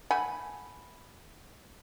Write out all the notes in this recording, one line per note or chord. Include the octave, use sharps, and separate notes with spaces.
A3 F#5 G#5 B5